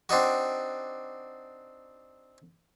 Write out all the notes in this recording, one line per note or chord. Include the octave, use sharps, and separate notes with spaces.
C4 D4 D#4 F#4